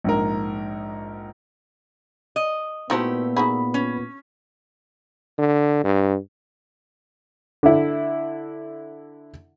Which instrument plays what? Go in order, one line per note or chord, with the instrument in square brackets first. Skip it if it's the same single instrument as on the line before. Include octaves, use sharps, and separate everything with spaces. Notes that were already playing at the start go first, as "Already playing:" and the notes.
[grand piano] A#1 G#2 A#4
[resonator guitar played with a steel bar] D#5
[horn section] A#2 B3 [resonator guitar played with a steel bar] A3 E4 G4 [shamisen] D#4 F#4 C5
[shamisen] D#4 F#4 G#4 [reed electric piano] B5
[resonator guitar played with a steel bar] C#4
[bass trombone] D3
G2
[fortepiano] D3 E4